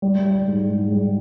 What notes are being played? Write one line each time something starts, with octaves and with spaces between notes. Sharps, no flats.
G3
G3
G#2
G#2
G3